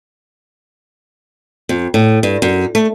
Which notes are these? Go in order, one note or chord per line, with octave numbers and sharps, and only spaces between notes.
F2
A2
G2
F#2
A3